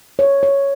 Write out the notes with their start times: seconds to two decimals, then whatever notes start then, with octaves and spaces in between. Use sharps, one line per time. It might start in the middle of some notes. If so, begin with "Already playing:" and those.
0.19 C#5
0.43 C#5